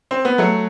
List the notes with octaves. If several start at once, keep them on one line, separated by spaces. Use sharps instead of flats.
C4
B3
F#3 A3